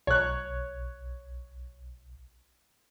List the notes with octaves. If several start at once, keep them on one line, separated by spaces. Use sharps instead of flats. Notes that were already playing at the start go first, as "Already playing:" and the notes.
B1 C#5 F#6